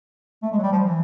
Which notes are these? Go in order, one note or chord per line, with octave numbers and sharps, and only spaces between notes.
A3
G#3
F#3
G3
F3
E3